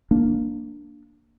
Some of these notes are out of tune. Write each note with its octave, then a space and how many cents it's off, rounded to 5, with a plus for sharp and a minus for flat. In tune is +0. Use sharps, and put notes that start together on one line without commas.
A#3 +0 D4 +0